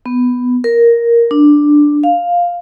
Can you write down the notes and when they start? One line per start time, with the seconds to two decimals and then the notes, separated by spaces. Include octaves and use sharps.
0.06 B3
0.64 A#4
1.31 D4
2.04 F5